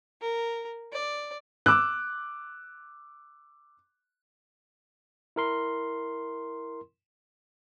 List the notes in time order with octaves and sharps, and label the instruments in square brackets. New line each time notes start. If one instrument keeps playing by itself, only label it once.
[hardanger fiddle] A#4
D5
[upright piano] D6 E6 F#6
[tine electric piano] E4 A#4 C6